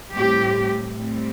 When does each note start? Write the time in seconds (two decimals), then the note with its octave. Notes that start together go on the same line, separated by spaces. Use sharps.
0.13 A2 G3 C4 G4
0.96 A2 G3 C4